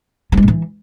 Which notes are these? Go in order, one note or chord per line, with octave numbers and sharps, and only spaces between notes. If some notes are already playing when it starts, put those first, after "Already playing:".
G3
G#3
A2
E3